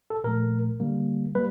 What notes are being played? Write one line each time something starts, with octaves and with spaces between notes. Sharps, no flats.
A4
A#2 F3 A3 A#4
D3 G3 A#3
G3 A#3 B4